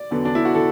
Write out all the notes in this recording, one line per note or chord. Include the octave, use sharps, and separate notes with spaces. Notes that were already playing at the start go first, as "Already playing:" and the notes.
Already playing: D5
E2 D3 F#3 B3
D4
E4
F#4
D3 A4